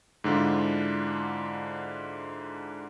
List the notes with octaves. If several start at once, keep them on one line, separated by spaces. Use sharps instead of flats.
G#2 D3 D4 E4 F4